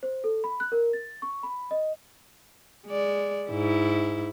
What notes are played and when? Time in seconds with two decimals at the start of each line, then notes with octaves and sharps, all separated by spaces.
0.03 C5
0.24 A4
0.44 B5
0.60 F#6
0.72 A#4
0.93 A6
1.22 C#6
1.43 B5
1.71 D#5
2.87 G#3 D5
3.50 G#2 E4